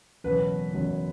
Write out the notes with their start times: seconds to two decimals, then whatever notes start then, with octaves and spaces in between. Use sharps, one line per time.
0.24 F#1 E2 B2 F#3 B4
0.74 F#1 E2 B2 F#3